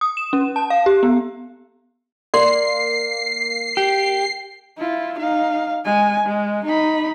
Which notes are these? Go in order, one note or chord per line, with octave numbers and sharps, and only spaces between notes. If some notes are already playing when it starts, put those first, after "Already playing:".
D#6
E7
C#4
A5
F5
G4
B3
A#3 D5 C6 C7
G4
E4 F4
D#4 F5
G#3 G#5
G#3
D#4 B5